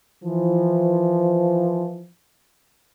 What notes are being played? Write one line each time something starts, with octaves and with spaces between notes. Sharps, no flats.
E3 F3